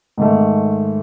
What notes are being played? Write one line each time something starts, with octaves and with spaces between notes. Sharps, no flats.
G#2 D#3 A3